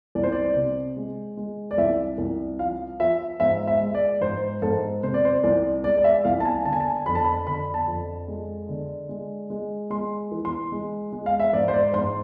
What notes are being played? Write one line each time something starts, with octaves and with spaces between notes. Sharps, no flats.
C2 D5
C5
D5
C3
G#3
G#3
D5
C2 E5
C2
F3 F5
F3 E5
G#2 E5
E5
G#3
D5
G#2 C5
G#2 A4
C3 C5
D5
C5
C2 D5
G#3 D5
D5
E5
C2 F5
A5
G#5
D3 A5
G#5
A5
F2 B5
A5
B5
D3 B5
A5
F2
G#3
D3
G#3
G#3
G#3 C6
E3
C6
G#3
G#3
F5
E5
G#2 D5
C5
D5
G#2 C6